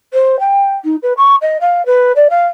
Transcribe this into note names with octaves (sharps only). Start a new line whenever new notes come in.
C5
G5
D#4
B4
C#6
D#5
F5
B4
D5
F5